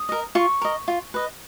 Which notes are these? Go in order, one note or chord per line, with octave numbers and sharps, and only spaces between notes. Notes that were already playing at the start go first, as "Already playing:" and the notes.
Already playing: D#6
A#4 D#5
F4 C#6
A#4 D#5
F4
B4 D#5